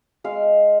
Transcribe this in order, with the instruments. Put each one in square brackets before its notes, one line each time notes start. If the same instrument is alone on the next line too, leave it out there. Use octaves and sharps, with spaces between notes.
[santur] G#3 F5